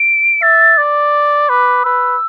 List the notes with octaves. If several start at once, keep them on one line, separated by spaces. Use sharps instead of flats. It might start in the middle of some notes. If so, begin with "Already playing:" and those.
Already playing: D7
E5 A6
D5
B4 D6
B4 E6